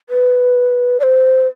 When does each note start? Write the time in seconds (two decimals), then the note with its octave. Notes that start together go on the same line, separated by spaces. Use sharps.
0.09 B4
1.00 D5
1.03 C5